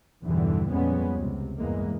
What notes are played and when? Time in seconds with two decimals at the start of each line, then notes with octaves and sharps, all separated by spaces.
0.23 B1 E2 G2 D3 E3 G3
0.71 F2 A#2 G3 G#3 B3 C#4
1.16 C#2 C3
1.58 E2 G2 E3 G#3 A#3